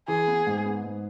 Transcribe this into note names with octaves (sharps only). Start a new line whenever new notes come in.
E3 G#4
B3
G#2
B3
G#2